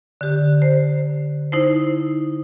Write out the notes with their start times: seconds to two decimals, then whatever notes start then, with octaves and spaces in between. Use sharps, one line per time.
0.21 D3 G4
0.62 C5
1.52 D#4 E4 C5